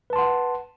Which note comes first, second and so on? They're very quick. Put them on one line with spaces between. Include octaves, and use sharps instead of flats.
B4 A5 C6 F#5